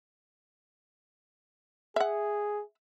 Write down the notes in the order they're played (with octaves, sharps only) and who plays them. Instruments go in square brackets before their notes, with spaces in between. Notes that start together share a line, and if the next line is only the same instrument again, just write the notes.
[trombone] G#4 [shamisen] E5 F#5